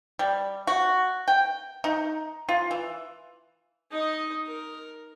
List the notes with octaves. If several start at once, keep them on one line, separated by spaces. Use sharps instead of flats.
G3
F#4
G5
D#4
F4
E3
D#4 D#5
A#4